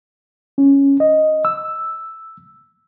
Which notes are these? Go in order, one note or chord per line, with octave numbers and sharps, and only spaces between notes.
C#4
D#5
E6